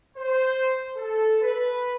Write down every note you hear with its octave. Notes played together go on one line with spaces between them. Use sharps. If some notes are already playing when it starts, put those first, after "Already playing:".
C5
A4
B4